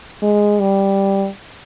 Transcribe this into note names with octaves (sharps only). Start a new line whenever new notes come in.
G#3
G3